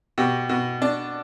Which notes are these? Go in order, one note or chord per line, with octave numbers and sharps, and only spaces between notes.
B2 G4
B2
D4